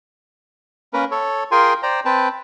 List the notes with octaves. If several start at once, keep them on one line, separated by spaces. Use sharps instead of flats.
A#3 C#4 A#4 B4
A4 C#5
F4 G#4 A#4 G5 G#5 C6
C5 D5 G5 A#5
C4 B4 G5 A5